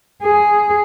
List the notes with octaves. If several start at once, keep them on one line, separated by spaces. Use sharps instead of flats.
G#4